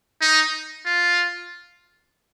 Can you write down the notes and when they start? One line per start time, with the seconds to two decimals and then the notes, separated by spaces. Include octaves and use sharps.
0.21 D#4
0.85 F4